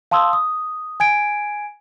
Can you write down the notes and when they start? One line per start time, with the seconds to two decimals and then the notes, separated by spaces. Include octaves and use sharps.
0.11 F5 A5 C6 D#6 E6
0.33 D#6
1.00 G#5 G#6 D7